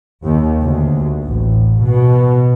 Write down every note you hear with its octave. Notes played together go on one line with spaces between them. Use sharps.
D#2
D2
A1
B2